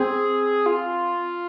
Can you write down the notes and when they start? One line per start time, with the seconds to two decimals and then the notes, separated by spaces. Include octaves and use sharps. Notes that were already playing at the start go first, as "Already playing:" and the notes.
Already playing: C4 G#4
0.66 F4